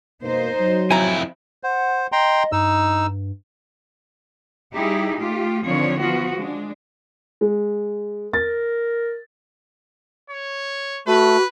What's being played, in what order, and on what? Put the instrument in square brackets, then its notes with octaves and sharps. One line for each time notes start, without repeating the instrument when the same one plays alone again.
[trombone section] B2 A#3 [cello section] D#4 C5
[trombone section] F#3
[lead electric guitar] F2 E4 [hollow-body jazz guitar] G#5 A#5
[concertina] C5 [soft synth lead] F#5
[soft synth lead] D#5 [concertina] G5 A#5 C6
[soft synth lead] G2 [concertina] D#4 E6
[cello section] G3 D#4 E4 G4 G#4
A3 F4 G4
D3 D#3 F3 C4 D4 C#5
F3 B3 F4 F#4
G#3 D4
[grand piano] G#3
[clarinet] A#4 [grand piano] A6
[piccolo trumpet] C#5
[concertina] A3 [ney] F#4 [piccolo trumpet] B4